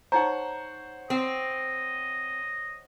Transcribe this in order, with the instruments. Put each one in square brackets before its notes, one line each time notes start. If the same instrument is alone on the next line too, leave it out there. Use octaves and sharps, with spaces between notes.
[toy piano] D#4 A#5 [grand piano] C5 C#5 F#5
[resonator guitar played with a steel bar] C4 [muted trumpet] D#5